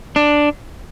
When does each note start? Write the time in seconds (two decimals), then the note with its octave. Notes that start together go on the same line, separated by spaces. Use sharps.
0.16 D4